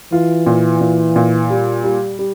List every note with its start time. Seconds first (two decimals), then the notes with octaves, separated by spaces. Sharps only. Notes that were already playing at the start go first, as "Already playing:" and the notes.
0.12 E3 F4
0.46 A#2
0.81 A#2
1.16 A#2
1.50 G3
1.83 G3
2.19 G3